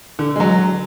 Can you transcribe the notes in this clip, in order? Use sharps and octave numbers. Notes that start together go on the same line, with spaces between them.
D3
G#3
F#3